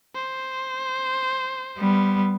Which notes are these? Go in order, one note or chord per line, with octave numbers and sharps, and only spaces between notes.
C5
G3 B3